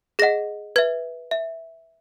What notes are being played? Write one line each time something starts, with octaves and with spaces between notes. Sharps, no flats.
G#4 D#5 F#5 A#6
B4 E5 G#6
E5